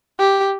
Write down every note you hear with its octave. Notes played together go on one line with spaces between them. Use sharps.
G4